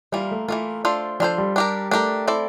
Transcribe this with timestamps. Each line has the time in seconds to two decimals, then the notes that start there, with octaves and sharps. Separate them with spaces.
0.12 E3 G3 A#3 F4
0.31 A3
0.48 E3 A3 A#3 F4
0.85 D4 F4 A4 C5
1.20 F3 D4 F4 A4 C5
1.38 G3
1.56 D4 G4 A#4
1.91 A3 D4 G4 A#4
2.28 C4 E4 A4 D5